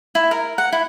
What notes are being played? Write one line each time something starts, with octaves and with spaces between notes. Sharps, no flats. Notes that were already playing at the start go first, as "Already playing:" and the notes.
E4
A#4
F#5
E4